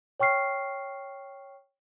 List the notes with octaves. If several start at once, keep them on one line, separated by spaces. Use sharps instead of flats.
C#5 G5 C#6 F6 C7